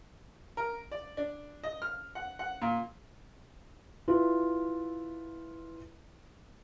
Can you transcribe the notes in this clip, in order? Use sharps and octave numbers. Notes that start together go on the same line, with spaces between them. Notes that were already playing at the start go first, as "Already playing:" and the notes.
A#4
D5
D4
D#5
F6
F#5
F#5
A#2
E4 F4 B4